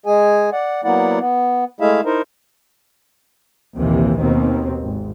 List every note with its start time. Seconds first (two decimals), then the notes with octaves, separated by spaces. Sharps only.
0.06 G#3 G#4 G#5
0.52 D5 F#5
0.84 F#3 A#3 B3 E4 D5 F#5
1.20 B3
1.81 G#3 A3 E4 G#4 E5 F5
2.05 D#4 E4 A#4 C5
3.75 A#1 D#2 C3 E3
4.19 D#2 B2 D#3 C4
4.81 G#1